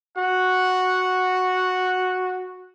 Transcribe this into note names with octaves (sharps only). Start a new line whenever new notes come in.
F#4 F#5